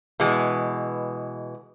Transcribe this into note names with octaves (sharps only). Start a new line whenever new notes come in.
B2 E3 G#3